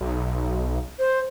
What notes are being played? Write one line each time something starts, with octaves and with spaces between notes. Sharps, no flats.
B1
C5